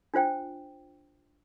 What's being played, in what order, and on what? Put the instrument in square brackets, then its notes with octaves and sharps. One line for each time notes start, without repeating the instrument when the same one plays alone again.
[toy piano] D4 F4 C5 G5